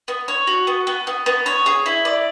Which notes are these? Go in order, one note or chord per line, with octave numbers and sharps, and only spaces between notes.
B3
C#5
F#4
B3
B3
B3
B3
C#5
G#4
E4
D5